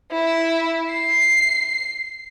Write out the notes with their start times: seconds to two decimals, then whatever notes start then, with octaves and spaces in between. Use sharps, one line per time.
0.11 E4
0.93 C7